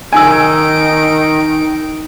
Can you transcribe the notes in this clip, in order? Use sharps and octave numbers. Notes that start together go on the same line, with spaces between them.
D#3 D#4 G#5 E6 D7